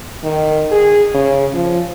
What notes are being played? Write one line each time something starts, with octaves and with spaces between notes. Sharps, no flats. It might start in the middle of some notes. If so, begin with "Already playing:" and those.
D#3
G#4
C#3
F3